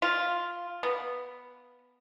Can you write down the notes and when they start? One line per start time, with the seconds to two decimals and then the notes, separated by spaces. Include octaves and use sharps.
0.02 F4
0.83 B3